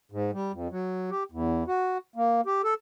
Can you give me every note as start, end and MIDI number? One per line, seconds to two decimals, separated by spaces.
0.12 0.31 44
0.33 0.52 55
0.53 0.68 41
0.71 1.10 54
1.11 1.23 67
1.32 1.64 40
1.68 1.98 66
2.16 2.41 58
2.46 2.62 67
2.64 2.74 69